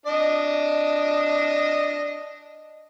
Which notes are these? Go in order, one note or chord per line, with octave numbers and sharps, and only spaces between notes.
D4 D#5